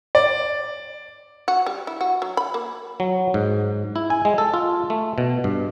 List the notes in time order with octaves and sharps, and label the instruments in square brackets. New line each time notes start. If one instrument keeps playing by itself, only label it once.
[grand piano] D5
[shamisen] F#4
G3
E4
F#4
F#3
B5
A#3
[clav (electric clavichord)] F#3
G#2
E4
G#5
G#3
A4
F4
A3
B2
G2